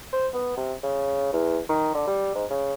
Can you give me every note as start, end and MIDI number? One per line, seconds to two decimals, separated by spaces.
0.12 0.28 72
0.34 0.54 59
0.57 0.73 48
0.83 1.30 49
1.33 1.59 40
1.69 1.92 51
1.94 2.05 50
2.07 2.32 55
2.34 2.45 44
2.50 2.74 49